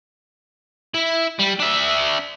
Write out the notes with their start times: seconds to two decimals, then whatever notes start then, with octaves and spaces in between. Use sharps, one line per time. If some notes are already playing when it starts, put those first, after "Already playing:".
0.94 E4
1.39 G3
1.60 D4 E5